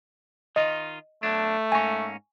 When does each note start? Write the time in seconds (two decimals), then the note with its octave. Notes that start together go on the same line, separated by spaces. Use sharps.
0.56 D#3 D#4 F4 D#5
1.23 B2 F#3 A3 D4
1.72 G#2 A#3 C#4 G#5 C#6